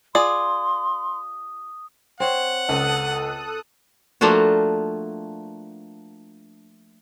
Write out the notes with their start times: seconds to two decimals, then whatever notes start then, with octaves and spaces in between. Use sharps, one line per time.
0.15 F4 G#4 D5 C6 D#6
2.20 C4 C#5 F#5
2.69 C#2 A4 D#6 F#6
4.21 F3 A3 A#3 D4 F4 F#4